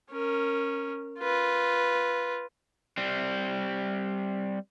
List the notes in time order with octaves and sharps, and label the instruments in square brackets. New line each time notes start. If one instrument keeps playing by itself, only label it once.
[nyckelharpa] C#4 A#4
F4 B4
[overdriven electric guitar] G3 C4